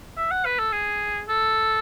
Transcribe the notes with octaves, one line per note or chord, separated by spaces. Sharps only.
E5
F#5
B4
A4
G#4
A4